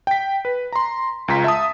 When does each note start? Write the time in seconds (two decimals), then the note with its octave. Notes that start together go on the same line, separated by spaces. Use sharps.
0.07 G5 B6
0.45 B4
0.73 A#5 C6
1.28 C#2 F4 A#5 C6 B6
1.44 E5 A5 D#6